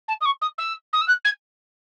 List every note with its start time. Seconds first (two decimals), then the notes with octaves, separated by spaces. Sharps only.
0.08 A5
0.21 D#6
0.25 C#6
0.41 D#6
0.58 E6
0.93 D#6
1.01 E6
1.08 F#6
1.24 G#6